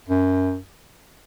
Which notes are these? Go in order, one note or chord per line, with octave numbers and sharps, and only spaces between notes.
F#2